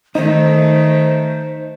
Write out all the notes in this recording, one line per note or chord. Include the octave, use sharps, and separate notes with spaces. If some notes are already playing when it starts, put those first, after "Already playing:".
D#3 A3 D#4 C5